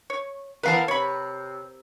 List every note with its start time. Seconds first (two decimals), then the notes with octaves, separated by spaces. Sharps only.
0.10 C#5
0.63 E3 B3 A#4 B4 F5 A5
0.88 C3 C#5 B5